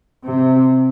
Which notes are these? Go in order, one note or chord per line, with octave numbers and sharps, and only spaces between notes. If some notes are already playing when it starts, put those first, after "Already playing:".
C3